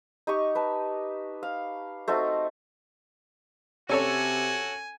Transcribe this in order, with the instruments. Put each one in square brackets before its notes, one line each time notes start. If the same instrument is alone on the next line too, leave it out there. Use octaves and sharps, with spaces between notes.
[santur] D#4 G4 C#6
B4 A5
F5
A3 C4 D#4 F#4
[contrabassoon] C3 [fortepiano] C#4 A4 C#5 [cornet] F#4 [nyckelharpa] G#5